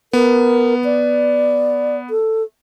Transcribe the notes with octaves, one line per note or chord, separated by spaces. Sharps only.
B3 A#4
D5
A4